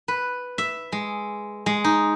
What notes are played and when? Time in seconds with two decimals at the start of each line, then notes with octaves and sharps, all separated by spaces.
0.08 B4
0.58 E5
0.92 G#3
1.66 G#3
1.84 D#4